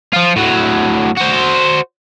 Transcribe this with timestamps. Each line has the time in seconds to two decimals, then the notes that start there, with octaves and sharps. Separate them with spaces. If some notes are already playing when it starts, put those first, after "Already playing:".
0.13 F3 F4
0.36 A2 F#3
1.17 F#4 C5